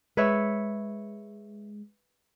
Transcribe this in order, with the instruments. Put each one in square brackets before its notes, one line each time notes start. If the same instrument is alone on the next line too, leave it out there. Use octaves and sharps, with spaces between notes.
[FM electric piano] G#3 [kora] B4 C#5 E5